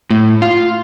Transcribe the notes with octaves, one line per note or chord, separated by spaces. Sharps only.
A2
F4